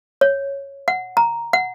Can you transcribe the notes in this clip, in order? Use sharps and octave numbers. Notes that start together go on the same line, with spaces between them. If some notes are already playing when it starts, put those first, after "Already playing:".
C#5
F#5
A#5
F#5